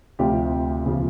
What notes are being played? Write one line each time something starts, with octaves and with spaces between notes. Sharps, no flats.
D2 C3 F3 F4 G4
E2 C#3 F3